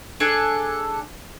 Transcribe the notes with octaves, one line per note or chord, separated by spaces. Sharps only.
D4 G#4 A4 G#5